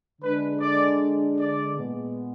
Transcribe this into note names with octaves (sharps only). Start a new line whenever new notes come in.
D3 G#3 D4 B4
D5
D5
A#2 G#3 B3